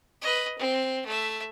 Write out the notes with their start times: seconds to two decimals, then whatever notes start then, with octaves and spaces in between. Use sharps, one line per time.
0.22 B4 D#5
0.58 C4
1.06 A3 E5